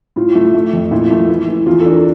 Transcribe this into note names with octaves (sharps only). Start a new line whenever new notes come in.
A2 F4
A3
A3
F2
A#2 E4
A3
E3
E3
E2 F4
A4
D4
A#4